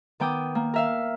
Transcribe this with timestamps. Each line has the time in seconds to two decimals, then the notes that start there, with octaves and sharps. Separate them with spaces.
0.20 D#3 B3 G5 D6 D#6
0.55 A#3
0.74 A#4 E5 F5